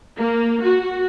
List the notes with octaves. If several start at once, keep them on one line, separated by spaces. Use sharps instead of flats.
A#3
F#4